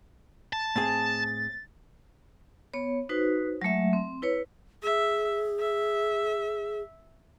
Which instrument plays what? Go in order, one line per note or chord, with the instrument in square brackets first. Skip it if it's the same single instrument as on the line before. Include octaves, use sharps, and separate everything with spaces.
[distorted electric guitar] A5
[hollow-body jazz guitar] A2 C4 G#4 [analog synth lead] A6
[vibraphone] B3 C#5
D#4 F#4 B4 C5
F#3 G#3 A3 E5
C4
E4 B4 C#5
[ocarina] G#4 [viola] E5
[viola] E5